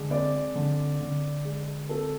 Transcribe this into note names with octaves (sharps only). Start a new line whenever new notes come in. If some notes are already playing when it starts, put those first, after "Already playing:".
Already playing: D3 G#3
C4 D5
D3
D3
G#3
C4 A4